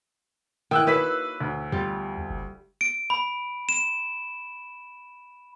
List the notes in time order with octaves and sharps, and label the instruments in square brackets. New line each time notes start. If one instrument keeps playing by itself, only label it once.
[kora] D#3 E3 [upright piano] G5 E6 F#6
[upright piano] A#3 B4 B6 [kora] F#4 C#5 E5
[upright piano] D2
[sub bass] E2 [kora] G3 F4
[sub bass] F#1
[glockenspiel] D7
B5
E7